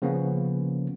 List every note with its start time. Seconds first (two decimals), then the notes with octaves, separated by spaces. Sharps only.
0.02 C#3 F3 A#3 B3 C#4